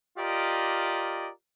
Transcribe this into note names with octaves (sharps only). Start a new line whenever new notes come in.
F4 G4 A#4 D5 D#5